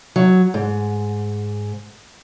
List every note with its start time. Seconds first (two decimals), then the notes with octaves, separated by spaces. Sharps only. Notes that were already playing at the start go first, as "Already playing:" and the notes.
0.16 F#3
0.54 G#2